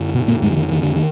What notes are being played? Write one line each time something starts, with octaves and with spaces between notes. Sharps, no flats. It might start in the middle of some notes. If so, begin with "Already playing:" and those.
Already playing: F#2 D3
B2 B3
A#2 A#3
F2 G#2 D3 G#3
F3
D#3
D#3
D3
D#3